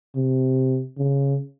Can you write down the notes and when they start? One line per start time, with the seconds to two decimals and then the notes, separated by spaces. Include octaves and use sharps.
0.16 C3
0.98 C#3